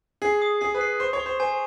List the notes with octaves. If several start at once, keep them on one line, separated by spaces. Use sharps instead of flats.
G#4 C7
D#6
G#4 C7
B4
C7
C5 C#6
C#5
C#6
C5
C5 G#5